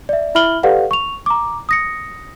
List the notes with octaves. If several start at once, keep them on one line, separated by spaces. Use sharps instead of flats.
D5 E5
E4 E5 B5 F6 F#7 G7
G4 A4 B4 D5 F5 F#5
C#6 F7
A#5 D6
D#6 A#6 C#7